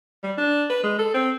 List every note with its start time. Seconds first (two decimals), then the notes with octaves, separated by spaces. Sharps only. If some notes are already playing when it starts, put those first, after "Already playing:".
0.23 G3
0.37 D4
0.70 B4
0.84 G#3
0.99 A4
1.14 C4